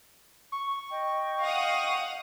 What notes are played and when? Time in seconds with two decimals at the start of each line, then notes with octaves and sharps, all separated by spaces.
0.52 C#6
0.89 D#5 G5
1.42 F5 F#5 D#6